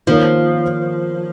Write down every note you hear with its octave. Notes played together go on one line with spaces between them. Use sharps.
D#3 F3 A#3 F4 A#4 C#5